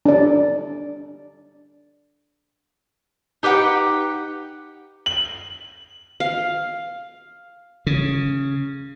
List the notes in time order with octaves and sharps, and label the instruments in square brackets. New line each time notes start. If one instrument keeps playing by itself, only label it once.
[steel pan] D4 D5
[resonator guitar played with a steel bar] D#4 G4 B4 F#5 G5
[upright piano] F#7
[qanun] F5
[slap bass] C#3